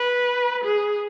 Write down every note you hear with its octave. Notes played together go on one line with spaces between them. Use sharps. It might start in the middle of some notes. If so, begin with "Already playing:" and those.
Already playing: B4
G#4